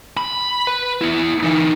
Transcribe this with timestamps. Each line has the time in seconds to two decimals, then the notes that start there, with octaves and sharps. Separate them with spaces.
0.17 B5
0.67 B4
1.01 B3 E4
1.43 E3 D#4